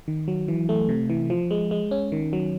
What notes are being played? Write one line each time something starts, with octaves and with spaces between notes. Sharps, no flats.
D#3
F#3
E3
A3
C3
E3
F3
G#3
G#3
C#4
D#3
F#3